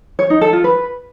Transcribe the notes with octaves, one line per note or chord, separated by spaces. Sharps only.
C#5
D#4
A4
F4
B4